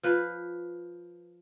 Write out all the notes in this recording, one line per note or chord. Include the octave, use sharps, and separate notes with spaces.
F3 B4